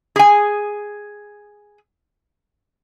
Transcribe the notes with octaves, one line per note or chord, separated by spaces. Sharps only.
G#4 G#5